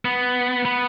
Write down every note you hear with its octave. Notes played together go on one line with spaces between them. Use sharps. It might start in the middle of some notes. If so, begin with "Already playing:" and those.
B3
B3